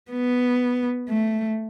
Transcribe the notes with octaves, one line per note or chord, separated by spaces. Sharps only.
B3
A3